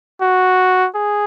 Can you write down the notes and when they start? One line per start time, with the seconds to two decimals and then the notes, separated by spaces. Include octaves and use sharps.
0.21 F#4
0.95 G#4